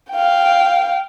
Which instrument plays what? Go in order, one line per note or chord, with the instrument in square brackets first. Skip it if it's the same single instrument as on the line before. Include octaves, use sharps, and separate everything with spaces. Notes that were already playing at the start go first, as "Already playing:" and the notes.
[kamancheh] F5 G5